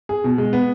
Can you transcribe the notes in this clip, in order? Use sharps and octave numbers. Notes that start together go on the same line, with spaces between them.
G#4
B2
G#3
B3